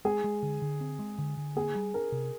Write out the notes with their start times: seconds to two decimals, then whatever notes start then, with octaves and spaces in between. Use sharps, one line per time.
0.05 G#3 G#4
0.24 G#3
0.43 D3
0.62 D3
0.81 C4
0.99 G#3
1.18 D3
1.37 D3
1.56 A#3 G#4
1.75 G3
1.94 D4 A#4
2.12 C3